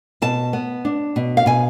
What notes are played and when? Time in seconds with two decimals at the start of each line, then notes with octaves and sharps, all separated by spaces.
0.22 B2 A5
0.53 B3
0.85 D4
1.16 B2
1.37 F5
1.46 B2 G#5